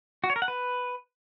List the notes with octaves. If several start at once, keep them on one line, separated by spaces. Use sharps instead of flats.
F#4
C#5
A#4
F#5
B4